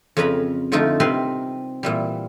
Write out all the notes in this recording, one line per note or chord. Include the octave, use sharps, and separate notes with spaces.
F2 C#3 A#4 B4 A#5 B5
D3 F3 A3 D#4 F4
C3 G3 C4 A#4 B4 C6
A#2 E3 G3